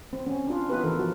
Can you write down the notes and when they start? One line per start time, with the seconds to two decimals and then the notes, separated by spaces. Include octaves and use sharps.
0.13 C4
0.27 C4 C#4
0.47 D4 F4
0.70 B3 D#4 F4 G4 B4
0.84 E3 D#4 A4 A#4
0.98 F3 F#4